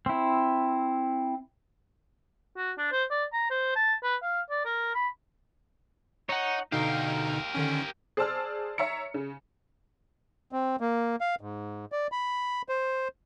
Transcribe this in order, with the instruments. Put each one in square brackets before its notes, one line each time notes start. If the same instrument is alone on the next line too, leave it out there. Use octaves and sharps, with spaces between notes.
[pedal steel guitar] C4 E4
[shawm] F#4
D4
C5
D5
A#5
C5
A5
B4
F5
D5
A#4
B5
[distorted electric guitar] D#4 [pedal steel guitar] C#5 F#5
[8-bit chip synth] B2 D3 D#4 [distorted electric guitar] G4 A#4 [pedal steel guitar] F5
[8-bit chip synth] D3 D#3 C#4
[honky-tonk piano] G#4 C5 D5 A5 E6 F6
C#5 E5 A#5 C#7
C#3
[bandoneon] C4
A#3
F5
G#2
D5
B5
C5